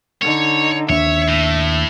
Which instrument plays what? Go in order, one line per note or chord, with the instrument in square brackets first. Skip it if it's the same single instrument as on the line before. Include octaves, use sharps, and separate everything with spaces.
[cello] D3 D#4 [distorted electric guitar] C#5
[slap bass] D#2 D4 [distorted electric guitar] C#5 [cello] E5
[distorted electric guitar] A2